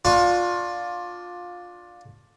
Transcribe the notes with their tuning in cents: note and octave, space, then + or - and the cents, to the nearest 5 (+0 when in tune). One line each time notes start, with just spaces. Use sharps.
D4 +0 F4 +20 C#6 +35